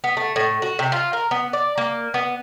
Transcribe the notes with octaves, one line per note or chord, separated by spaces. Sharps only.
B3
A3
A2
F#4
C3
F4
A#4
B3
D5
A#3
B3